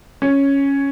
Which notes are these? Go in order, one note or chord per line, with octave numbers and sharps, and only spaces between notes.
C#4